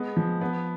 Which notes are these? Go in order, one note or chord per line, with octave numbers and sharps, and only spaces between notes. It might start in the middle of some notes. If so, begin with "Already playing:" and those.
Already playing: G#3 B3
F3
B3